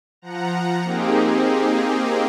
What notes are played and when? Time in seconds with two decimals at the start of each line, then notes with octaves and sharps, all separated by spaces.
0.22 F3 F#5 A#5
0.84 A#3 C4 D#4 G4 G#4